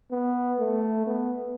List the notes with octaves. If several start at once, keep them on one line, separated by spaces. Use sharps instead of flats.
B3
A3
B3